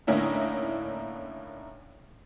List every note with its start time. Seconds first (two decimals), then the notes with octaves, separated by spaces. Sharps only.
0.07 A2 D3 A#3 C#4 D#4 E4